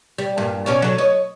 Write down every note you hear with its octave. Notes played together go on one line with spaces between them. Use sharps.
G3
G2 A#2
B2 C#4 D5
D3 F#3
C#5 D#5